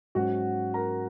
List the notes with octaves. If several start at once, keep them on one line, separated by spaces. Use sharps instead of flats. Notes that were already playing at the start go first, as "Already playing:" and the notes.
G#2 F#3 C#4 F#4 F#5
A#4 A#5